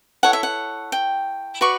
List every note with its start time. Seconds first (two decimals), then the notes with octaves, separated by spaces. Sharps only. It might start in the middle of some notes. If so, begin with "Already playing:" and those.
0.23 E4 A4 C#5 F#5
0.33 E5
0.43 F#5
0.92 G5
1.61 F#4 B4 D5 C#6